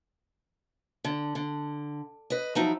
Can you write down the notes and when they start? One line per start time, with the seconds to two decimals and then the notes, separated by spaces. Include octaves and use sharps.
1.04 D3
1.35 D3
2.30 B4 D#5
2.55 F3 F#3 D#4 E4